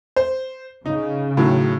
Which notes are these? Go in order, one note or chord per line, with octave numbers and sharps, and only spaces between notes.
C5
C#3 D#4
A2 D#3 F#3